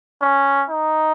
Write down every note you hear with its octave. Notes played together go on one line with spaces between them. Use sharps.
C#4
D#4